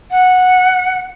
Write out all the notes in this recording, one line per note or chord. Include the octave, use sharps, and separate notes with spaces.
F#5